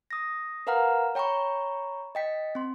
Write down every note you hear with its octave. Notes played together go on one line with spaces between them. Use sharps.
D#6 A#6
A#4 B4 F5 F#5 A#5 F6
C#5 G5 A#5 B5 C#6
D#5 G5 B6
C4 C6